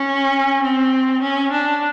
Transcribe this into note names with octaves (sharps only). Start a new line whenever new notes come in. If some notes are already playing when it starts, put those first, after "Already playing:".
Already playing: C#4
C4
C#4
D4